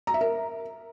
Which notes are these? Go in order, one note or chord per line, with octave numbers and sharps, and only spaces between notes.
A#5
E5
A#4